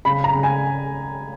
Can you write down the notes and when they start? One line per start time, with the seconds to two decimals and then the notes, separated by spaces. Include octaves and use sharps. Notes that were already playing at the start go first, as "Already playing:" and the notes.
0.05 C#3 B5
0.24 A#5
0.34 C#3
0.43 G#5